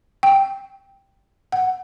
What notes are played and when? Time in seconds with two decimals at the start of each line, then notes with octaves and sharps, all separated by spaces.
0.23 G5
1.52 F#5